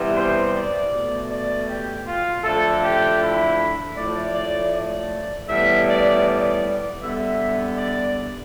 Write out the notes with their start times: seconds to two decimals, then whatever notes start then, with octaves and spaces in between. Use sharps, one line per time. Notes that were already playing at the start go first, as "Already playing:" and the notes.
Already playing: C3 E3 G3 B3
0.14 C5
0.53 D5
0.91 B2 A3
1.29 D5
1.67 G4
2.06 F4
2.43 D3 F3 A3 A4
2.82 G4
3.19 E4
3.95 A2 F3 A3 D5
4.34 D5
4.72 D5
5.48 A2 E3 G3 B3 E5
5.87 D5
6.24 D5
7.00 D3 G3 B3 E5
7.77 D5